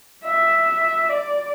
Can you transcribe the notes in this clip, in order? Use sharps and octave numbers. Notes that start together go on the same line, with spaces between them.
E5
D5